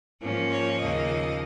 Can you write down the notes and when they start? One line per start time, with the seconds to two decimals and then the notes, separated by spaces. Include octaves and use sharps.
0.20 G#2 F3 A#3 C#4
0.50 C#5
0.79 D#2 C#3 F3 A#3 D#5